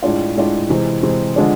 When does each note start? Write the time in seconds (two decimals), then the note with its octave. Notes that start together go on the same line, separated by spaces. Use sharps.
0.02 A2 G#3 D4 F4
0.36 A2 G#3 D4 F4
0.69 C3 E3 G#3 C4
1.03 C3 E3 G#3 C4
1.36 D3 F3 G#3 D4